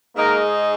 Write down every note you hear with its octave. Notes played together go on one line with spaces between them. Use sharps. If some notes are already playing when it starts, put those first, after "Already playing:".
G#2 G#3 A#3 D#4 A#4